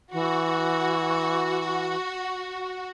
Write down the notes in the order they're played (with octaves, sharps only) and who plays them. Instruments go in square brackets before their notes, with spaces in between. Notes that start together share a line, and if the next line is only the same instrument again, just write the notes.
[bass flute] E3 [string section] F#4